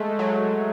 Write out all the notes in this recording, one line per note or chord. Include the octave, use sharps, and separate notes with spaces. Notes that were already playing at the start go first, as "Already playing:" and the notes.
Already playing: G#3 A3
F#3